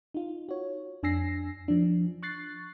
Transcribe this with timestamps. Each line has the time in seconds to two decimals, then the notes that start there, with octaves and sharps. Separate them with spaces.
0.14 D#4 F4
0.49 F#4 C#5
1.03 F2 D4 G#5 E6 A#6 C7
1.68 F3 D4
2.23 C#6 F#6 A6 C7